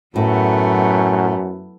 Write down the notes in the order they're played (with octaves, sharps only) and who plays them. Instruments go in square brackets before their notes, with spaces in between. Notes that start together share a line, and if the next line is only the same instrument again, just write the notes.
[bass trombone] F#2 [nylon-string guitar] A2 [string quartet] F#3 A3 B3